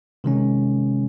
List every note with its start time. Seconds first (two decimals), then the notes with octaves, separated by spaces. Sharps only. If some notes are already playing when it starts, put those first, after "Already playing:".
0.24 C3 D#3 G#3 C#4